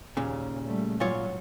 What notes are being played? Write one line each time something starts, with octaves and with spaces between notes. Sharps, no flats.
D#2 A#2 C#3
G3 A3
G#1 A#2 F#3 F4 C#5